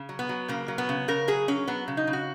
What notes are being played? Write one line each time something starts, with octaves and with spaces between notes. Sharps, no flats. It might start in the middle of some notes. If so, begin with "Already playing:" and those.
Already playing: C#3
F#3
B3
F#3
C#3 A#3
F#3
B3
C#3
C#3 A#4
F#3 G#4
F#3 C#4
F#3 B3
C#3
D#4
C#3
F#4